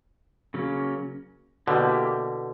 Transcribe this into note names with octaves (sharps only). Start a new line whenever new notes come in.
C#3 F#3 A#3 C#4
B2 D3 A#3 E4 G4